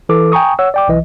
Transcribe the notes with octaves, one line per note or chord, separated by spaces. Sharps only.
E3 A4 D6
G5 G#5 A#5 C#6 D#6
C#5 F#5 E6
D5 G5 D6
B1 E3 D#5